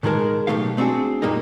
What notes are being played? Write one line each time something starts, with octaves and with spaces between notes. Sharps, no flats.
A2 D#3 G#3 G#4 A#4 A5
B1 G2 A3 D#4 G4 F5
A3 C4 D4 F#4 G#4
F#2 A#2 G3 A#3 D#4